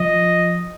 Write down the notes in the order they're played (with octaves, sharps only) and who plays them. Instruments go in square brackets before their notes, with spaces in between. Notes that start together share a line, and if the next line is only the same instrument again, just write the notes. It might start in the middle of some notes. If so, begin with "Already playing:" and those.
Already playing: [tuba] F3 [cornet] D#5